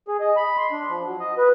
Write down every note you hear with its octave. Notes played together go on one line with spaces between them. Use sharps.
G#4
D#5
B5
C6
D4
F3
F#3
D#5
B4